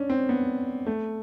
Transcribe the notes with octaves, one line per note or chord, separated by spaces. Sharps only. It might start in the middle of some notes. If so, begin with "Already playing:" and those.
Already playing: C#4 D4
C4
B3
A3